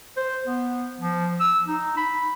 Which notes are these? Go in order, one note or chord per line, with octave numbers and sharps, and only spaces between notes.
C5
B3
F3
E6
D#4
B5